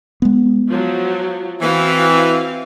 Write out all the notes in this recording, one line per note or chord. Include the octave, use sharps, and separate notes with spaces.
G#3 B3
F3 F#3
E3 C4 F#4 F5